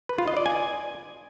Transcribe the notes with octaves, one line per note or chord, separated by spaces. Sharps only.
B4
F4
D#5
D5
G#5